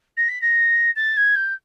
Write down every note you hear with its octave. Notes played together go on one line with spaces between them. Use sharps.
A#6
B6
A#6
A6
G#6
G6